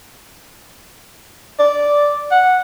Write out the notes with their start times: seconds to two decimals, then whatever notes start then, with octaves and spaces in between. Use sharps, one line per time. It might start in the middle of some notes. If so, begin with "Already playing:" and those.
1.59 D5
2.31 F#5